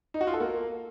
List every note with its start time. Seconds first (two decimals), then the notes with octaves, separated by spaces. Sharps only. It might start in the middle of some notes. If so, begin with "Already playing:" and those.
0.14 D#4
0.21 F#4
0.27 F4
0.34 A4
0.40 A#3